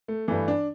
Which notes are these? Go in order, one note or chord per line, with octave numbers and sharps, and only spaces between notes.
A3
G2 E3 A3
D4